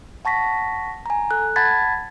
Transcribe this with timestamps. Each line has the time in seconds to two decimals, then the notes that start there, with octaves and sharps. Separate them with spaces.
0.25 F#5 A5 C#6 A#6 B6
1.06 G#5 A#5
1.31 A4 F#6
1.56 F#5 A5 B5 G#6 A6 B6